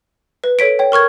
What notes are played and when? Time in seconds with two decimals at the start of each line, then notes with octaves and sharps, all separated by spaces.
0.44 B4
0.59 A4 C#5 B6 D7
0.79 C#5 G5
0.92 A#4 C#6 F6 G#6